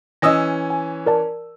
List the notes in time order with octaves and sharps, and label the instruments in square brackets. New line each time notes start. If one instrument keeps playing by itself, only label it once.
[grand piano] E3 C#4 E6 [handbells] D#5 D#6 A#6
[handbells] G#5
A#4 D5 A5